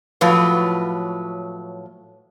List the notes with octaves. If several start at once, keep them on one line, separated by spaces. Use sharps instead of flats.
A2 F3 F#3 B4